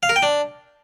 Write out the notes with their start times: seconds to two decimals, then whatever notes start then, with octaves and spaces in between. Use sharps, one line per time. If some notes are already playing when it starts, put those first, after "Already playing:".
0.03 F5
0.09 A#4
0.16 G5
0.23 D4